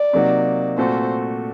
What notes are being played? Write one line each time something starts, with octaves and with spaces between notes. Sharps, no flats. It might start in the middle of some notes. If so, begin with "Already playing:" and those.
Already playing: D5
C3 F#3 A#3 D#4 F#4
A#2 A3 C4 F#4 A4 C5